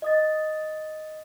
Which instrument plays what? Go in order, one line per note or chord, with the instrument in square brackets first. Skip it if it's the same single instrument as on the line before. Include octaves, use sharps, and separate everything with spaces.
[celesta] D#5 D#6 A6